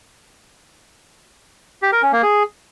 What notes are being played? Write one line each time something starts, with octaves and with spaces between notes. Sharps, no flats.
G4
A#4
C#4
A#3
G#4